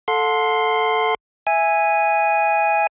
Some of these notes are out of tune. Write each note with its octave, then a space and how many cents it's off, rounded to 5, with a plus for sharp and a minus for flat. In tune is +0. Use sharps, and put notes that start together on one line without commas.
A4 +0 F#5 -45 C6 +0
E5 +0 G#5 -5